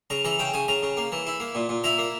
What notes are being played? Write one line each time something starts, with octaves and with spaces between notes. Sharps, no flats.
C#3 A#5
E3 A#5
C#3 G5
C#3 G#5
C#3 A#5
C#3
A#3
E3
E4
A#3
A#2
A#2
E4 A#5
A#3